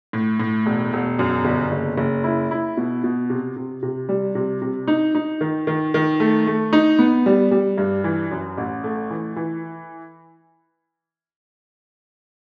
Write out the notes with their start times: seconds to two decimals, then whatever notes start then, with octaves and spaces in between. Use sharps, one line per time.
0.13 A2
0.40 A2
0.66 E1
0.93 E1
1.19 F#2
1.45 G1
1.72 F#1
1.98 F#1
2.24 E4
2.51 E4
2.77 B2
3.04 B2
3.30 C3
3.56 C3
3.83 C3
4.09 G3
4.35 C3
4.62 C3
4.88 D#4
5.15 D#4
5.41 D#3
5.67 D#3
5.94 D#3
6.20 A3
6.47 A3
6.73 D#4
6.99 B3
7.26 G3
7.51 G3
7.78 G2
8.04 E3
8.31 F#2
8.57 A1
8.84 A3
9.10 E3
9.36 E3